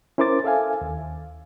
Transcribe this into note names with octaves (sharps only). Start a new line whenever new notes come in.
C#4 E4 A#4 C5 D6 A6
A4 E5 F5 G#5
D#2